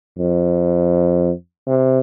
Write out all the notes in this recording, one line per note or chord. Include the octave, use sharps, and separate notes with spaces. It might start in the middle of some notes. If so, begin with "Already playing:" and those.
F2
C3